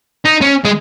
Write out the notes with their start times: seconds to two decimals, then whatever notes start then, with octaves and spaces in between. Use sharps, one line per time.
0.25 D#4
0.41 C#4
0.65 G#3